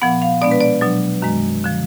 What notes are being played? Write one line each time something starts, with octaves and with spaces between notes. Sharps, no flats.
A#2 F3 B3 F#5
F5
B2 G#3 B3 D4 D5
B4
D5
B2 F#3 D4
F#2 D#3 G#3
D3 F3